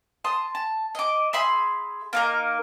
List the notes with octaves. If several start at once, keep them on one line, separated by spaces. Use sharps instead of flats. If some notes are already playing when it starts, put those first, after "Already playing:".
A5 C6 D#6
A5
D#5 D6
G#4 E5 B5 C6
A#3 D#4 A#4